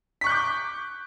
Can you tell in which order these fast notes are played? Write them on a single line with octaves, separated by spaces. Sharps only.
B6 C#6 F#6 G6 D6